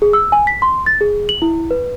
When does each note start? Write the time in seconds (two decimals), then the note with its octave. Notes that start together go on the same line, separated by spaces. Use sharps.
0.02 G#4
0.13 E6
0.32 G#5
0.47 B6
0.62 C6
0.86 A6
1.01 G#4
1.29 F#7
1.42 E4
1.71 B4